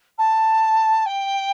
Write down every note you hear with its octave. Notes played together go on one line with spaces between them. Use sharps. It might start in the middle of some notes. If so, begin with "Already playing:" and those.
A5
G5